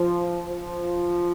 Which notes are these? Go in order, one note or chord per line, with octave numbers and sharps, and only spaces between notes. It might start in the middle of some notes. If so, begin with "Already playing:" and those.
Already playing: F3
F3